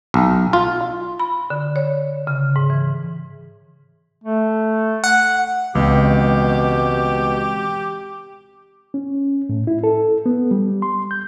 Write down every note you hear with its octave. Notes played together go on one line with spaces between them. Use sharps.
B1
F4
B5
D3
C#5
C#3
G#2
E3
A3
F#5
C#2 B2 E3 G#3 C4 G4
C#4
A2
E4
A4
B3
G3
C6
G6